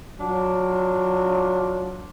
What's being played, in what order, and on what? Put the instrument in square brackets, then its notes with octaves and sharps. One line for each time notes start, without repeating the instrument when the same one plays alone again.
[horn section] F#3 D4 F4